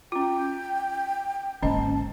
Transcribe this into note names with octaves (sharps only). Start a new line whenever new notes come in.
C#4 F4 G5
G#1 D3 A#3 C#4 D#5 A5